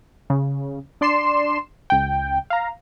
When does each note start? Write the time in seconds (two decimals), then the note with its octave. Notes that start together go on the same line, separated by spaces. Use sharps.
0.30 C#3
1.01 D4 D5 C6 C7 E7
1.90 C#2 G5
2.50 F5 A#5